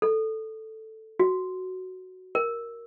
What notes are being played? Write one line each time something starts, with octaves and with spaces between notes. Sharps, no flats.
A4
F#4
A#4